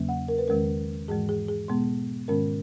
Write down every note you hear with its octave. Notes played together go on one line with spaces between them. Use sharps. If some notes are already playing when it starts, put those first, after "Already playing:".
Already playing: E2 C#3 F#3 A#3 C#4
F#5
A#4
B4
E2 D#3 G#3 C#4 A#4
G#2 E3 G#3 G#4
G#4
G#4
B2 G#3 B3
G#2 D#3 G#3 C#4 A#4